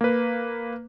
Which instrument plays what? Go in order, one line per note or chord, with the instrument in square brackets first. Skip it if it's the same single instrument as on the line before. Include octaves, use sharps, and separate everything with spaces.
[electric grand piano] A#3 B4